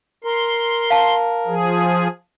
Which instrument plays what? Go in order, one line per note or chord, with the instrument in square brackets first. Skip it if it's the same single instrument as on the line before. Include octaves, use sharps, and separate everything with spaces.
[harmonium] A#4 [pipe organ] C6
[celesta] F5 A5
[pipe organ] F3 G#4